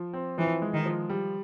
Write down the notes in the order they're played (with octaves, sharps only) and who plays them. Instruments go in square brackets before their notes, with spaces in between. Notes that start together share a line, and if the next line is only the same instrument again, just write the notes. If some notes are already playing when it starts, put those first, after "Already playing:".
Already playing: [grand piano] F3
C4
[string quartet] E3 [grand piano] F3
[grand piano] G#3
[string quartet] D#3
[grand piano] F3
G3